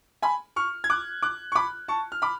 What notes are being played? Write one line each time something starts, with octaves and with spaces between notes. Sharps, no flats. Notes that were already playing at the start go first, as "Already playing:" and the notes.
G#5 B5
C#6 F6
G#6
D6 F#6
D6 F#6
C#6
B5 D6
A5 C#6
F6
B5 D6